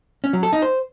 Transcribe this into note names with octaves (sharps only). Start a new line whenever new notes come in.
C#4
F#3
A4
D#4
C5